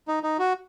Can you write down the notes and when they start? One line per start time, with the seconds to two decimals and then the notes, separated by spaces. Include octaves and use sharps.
0.08 D#4
0.23 D#4
0.39 F#4